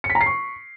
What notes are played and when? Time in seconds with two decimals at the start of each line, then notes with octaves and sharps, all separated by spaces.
0.04 C#7
0.10 B6
0.15 A#5
0.21 C7
0.26 C#6